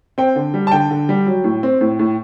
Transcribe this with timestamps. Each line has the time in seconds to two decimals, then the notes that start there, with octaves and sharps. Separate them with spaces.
0.18 C4 G5
0.36 D3
0.54 G3
0.67 A5
0.72 D3 G5
0.90 D3
1.09 G3
1.27 F#3
1.44 A2
1.63 C4
1.81 A2
1.99 A2